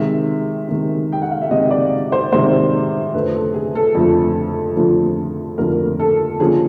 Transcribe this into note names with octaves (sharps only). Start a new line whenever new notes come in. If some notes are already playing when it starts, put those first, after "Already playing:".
Already playing: C3 D#3 G#3 E5
C3 D#3 G#3
G5
F#5
F5
E5
C3 D#3 G#3 D#5
D5
C5
C3 D#3 G#3 C5
F2 D3 F3 A3 B4
A4
G#4
A4
F2 D3 F3 A3
F2 D3 F3 A3
F2 D3 F3 A3 A#4
A4
D3 F3 A#3 C#4 G#4